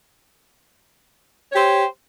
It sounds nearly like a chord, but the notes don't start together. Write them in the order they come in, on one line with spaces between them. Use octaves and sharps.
C#5 G4 C5